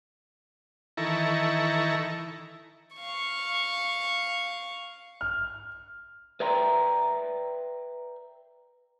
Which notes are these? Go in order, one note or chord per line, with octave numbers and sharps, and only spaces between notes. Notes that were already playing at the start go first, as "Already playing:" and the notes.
D#3 E3 E4 A4 A#5 C#6
F5 C#6
F6
B4 D5 E5 G5 A#5 C6